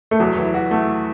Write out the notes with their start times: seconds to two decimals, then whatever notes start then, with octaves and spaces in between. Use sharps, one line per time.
0.11 A3
0.20 E2 F#3
0.37 E3
0.54 F#4
0.71 A3